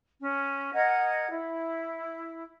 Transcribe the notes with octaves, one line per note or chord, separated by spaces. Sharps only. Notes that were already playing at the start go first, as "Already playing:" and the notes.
C#4
A#4 D#5 F#5 G#6
E4